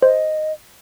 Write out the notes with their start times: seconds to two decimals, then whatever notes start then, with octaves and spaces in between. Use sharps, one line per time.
0.02 C5 D#5